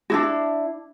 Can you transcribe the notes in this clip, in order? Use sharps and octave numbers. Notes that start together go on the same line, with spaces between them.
D4 E4 F#4